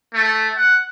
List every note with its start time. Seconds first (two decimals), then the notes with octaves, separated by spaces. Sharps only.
0.14 A3
0.56 F#5